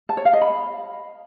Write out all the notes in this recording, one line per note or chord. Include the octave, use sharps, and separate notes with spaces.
A5
C#5
F5
D#5
B5